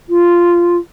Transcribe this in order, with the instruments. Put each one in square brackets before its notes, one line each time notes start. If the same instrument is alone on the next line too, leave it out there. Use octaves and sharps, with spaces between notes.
[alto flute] F4